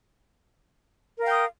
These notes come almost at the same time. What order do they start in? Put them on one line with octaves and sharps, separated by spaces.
A#4 F5 G5 D#6